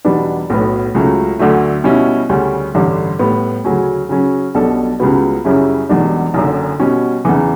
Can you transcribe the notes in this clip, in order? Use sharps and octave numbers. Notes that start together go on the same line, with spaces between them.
E2 B2 G3 B3 D4
B1 A2 F#3 B3
C#2 C#3 F#3 A3
D2 D3 F#3 A3
B2 G3 C#4 E4
D2 C#3 G3 C#4
A1 G2 D3 G3
A2 G3 B3
D2 C#3 F#3 C#4
C#3 F#3 C#4
B1 B2 G3 D4 A4
C#2 C#3 G3 B3 F#4
F#2 C#3 G3 C#4 E4
E1 E2 B2 G3 D4
F#1 F#2 D3
B2 G3 C#4 F#4
E2 C#3 E3